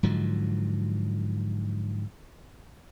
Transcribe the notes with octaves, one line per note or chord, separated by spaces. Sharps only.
G#2 D3 F3 F#3